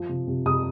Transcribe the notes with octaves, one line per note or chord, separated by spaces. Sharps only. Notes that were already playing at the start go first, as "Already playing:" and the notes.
Already playing: F3
C3
C3
C3 D#6